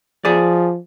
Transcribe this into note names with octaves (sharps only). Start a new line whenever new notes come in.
F3 G#4 D5